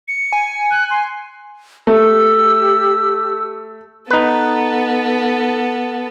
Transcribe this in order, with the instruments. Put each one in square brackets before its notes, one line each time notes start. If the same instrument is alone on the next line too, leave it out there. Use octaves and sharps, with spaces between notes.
[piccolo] C#7
[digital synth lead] G#5
[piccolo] F#6
C6
[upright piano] A3 [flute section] G4 E6
[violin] B3 A4 [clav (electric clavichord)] D#4 B4